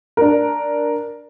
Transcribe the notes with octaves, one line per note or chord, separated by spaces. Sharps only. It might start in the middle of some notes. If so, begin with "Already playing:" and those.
D4 A#4